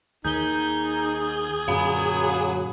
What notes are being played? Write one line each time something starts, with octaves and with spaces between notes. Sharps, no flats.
D#2 D#3 D#4 G#4 G6 G7
F#2 A#2 D3 F#3 F5 G#5 B5